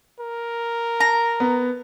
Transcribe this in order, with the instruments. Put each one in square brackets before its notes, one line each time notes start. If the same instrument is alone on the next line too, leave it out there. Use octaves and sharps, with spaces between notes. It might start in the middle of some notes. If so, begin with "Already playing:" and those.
[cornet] A#4
[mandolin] A#5
[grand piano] B3